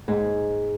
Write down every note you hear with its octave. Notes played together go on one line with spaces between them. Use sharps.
G#2